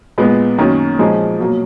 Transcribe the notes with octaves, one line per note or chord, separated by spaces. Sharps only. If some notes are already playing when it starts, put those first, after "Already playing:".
A#2 G#3 B3
F#2 D#3 A#3 C#4
A#2 F3 G#3 D#4 G#4
B2 F#3 A#3